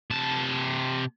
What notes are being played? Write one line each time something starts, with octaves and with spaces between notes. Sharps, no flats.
C3 A5